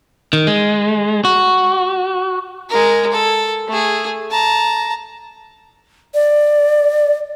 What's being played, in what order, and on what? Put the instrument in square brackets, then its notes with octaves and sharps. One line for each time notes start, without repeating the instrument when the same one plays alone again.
[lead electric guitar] D#3
G#3
F#4
[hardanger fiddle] G#3 A#4
A4
A3 G#4
A5 A#5
[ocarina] D5